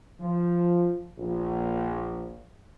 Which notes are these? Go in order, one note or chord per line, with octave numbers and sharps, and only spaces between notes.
F3
A#1